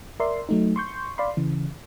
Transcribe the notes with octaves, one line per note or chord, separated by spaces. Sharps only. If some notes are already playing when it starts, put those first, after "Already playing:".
A#4 D5 E5 C6
F#3 A3 D#4
C6 C#6 G6
D5 F5 B5 C6
C#3 E3